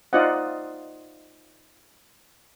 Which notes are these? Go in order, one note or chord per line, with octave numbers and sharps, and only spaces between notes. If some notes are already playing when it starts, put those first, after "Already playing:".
D#4 F4 C5 D5 D#5 F#5